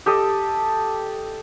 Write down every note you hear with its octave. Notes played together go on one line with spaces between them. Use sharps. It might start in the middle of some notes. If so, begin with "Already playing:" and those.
G4 A4 D#5